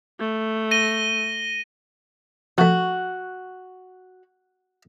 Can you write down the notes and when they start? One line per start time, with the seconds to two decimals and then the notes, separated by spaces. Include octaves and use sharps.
0.20 A3
0.71 A#6 D#7 G7
2.58 F3 A3 F#4